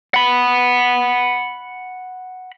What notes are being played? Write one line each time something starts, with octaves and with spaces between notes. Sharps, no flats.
F#5 B5